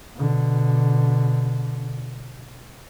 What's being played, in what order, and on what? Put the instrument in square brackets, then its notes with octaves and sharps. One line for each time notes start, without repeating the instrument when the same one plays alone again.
[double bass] B2 D3